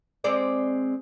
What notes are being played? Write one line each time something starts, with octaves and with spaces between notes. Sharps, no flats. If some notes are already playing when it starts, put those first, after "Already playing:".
G#3 C4 D5